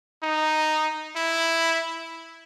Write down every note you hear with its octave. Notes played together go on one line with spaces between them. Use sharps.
D#4
E4